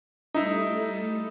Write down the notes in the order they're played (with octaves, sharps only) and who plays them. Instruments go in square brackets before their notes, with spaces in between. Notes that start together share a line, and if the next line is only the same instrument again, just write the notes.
[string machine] G3 A3 A4 [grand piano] D#4 E4